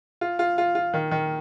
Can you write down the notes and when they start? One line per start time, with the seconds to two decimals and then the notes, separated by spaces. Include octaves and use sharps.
0.21 F4
0.39 F4
0.58 F4
0.75 F4
0.94 D#3
1.11 D#3